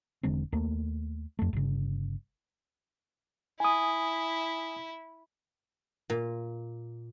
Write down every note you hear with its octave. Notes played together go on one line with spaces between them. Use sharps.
E1 D3 G#3 C4
D#2 A3 A#3
F2 A3
G1 C#3
E4 G#5 D#6
A#2